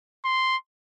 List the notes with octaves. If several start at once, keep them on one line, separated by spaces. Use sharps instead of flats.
C6